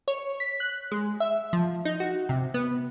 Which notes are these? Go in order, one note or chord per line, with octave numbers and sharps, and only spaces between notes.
C#5
B6
F#6
G#3
E5
F3
D#4
F#4
C3
B3